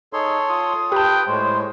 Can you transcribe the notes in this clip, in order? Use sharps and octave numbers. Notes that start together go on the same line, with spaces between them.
D#4 G#4 A4 C#5 C6
F4 D#6
G4 B4 G5 A5
A2 G#3 C5 C#5